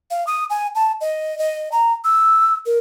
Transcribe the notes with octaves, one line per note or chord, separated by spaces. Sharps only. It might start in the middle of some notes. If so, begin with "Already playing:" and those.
F5
D#6
G#5
A5
D#5
D#5
A#5
E6
A#4